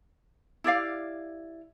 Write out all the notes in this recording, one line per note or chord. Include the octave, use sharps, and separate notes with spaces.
E4 G4 D5 F5